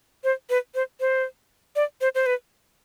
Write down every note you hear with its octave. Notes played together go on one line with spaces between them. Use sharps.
C5
B4
C5
C5
D5
C5
C5
B4